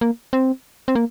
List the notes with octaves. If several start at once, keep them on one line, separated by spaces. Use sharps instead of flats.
A#3
C4
C4
A#3